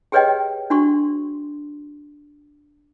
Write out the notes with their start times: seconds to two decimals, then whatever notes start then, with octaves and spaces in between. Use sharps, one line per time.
0.12 G4 G#4 B4 C#5 D#5 G5
0.70 D4 F#4 C6 C#6